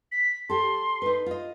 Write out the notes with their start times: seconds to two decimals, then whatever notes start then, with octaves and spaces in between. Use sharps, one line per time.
0.12 B6
0.49 G4 A4 C6
1.02 D#4 B4
1.26 F4 D#5